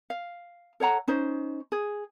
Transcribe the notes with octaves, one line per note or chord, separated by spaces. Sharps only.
F5
A4 C#5 F#5 A#5
C#4 D#4 C5
G#4